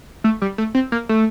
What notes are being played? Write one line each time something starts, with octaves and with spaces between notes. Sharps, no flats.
A3
G3
A3
C4
A#3
A3